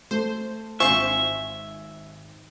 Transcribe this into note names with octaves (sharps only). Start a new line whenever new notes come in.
A3 C5
G#1 C4 F4 C5 E5 G#5 C#6